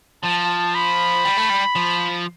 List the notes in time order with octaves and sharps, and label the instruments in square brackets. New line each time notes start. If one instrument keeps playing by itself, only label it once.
[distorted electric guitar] F3 [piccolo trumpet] A5
[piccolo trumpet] B5
[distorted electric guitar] G3
A3
G3
F3